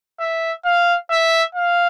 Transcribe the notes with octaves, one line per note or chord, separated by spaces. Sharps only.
E5
F5
E5
F5